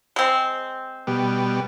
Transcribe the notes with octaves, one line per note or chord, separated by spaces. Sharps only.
G#3 C4
B2 G3